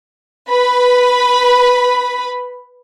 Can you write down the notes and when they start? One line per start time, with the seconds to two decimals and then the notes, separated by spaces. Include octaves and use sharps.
0.49 B4 B5